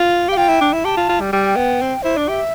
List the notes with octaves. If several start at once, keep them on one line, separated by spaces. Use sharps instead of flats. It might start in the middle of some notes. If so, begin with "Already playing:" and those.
Already playing: F4
G4
F5
F4 G5
E4
D4
E4
G4 A5
F4
F4
G3
G3 G5
B3
C4
E4 C5
D4 D5
G4 E5